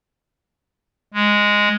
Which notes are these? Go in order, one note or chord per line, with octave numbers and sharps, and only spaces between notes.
G#3